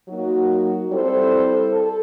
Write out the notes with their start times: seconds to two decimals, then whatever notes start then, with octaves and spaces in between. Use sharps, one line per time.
0.09 F#3 A#3 D#4 F#4
0.91 G3 C4 E4 A4 C5
1.71 A4